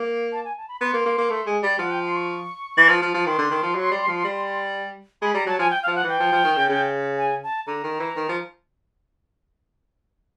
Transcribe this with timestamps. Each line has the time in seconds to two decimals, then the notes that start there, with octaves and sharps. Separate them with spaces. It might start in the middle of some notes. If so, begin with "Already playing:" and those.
Already playing: A#3
0.32 A5
0.45 G#5
0.57 A5
0.68 B5
0.81 B3 C6
0.94 A#3
1.06 A#3
1.18 A#3
1.30 A3
1.47 G#3
1.63 G3
1.79 F3 F#5
1.91 G5
2.04 C6
2.16 C#6
2.77 E3
2.89 F3
3.02 F3
3.14 F3
3.26 D#3 C6
3.39 D3
3.51 D#3
3.63 F3
3.75 F#3
3.92 G3
4.08 F3
4.24 G3
5.22 G#3 B5
5.34 G3 A#5
5.47 F#3 A5
5.59 F3 G#5
5.71 G5
5.83 F5
5.88 F3
5.96 F#5
6.04 E3 G5
6.20 F3
6.32 F3
6.45 D#3
6.56 C#3
6.69 C#3
7.18 G#5
7.43 A5
7.67 D3 A#5
7.84 D#3
8.00 E3
8.16 D#3
8.29 F3